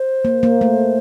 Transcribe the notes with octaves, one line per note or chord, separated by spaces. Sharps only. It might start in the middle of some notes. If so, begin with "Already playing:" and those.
Already playing: C5
A#3
A#3
A3